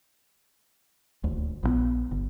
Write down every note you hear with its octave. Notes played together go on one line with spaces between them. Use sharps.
D#1 D2
A#1 D#3 B3
G1